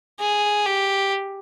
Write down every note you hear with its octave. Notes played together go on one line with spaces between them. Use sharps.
G#4
G4